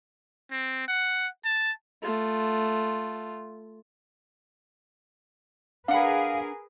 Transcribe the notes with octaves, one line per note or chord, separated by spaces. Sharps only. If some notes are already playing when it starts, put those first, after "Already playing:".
C4
F#5
A5
A3 F4
D4 G#4 A#4 B4 F5 F#5 B5